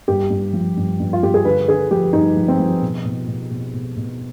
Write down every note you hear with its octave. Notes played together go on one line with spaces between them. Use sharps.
G2 G4
G2
F3
G2
G2
F4
G2 G4
G#4
D3 B4
D3 G#4
F3 G4
G2 D#4
F3
C4
F3
B2
B2
B2
B2
B2
B2